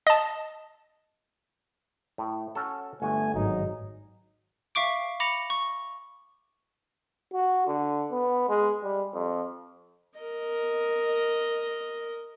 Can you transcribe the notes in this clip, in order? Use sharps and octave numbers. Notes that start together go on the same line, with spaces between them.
D#5 A5
A2
C#4 F#4 A4
G1 A3 F#4 G#5
G#1 F#3 D#4
E5 F5 C#6 D6 D7
B5 D6 A#6 C#7 F7
C#6
F#4
D3
B3
G#3
G3
F2
A#4 D#5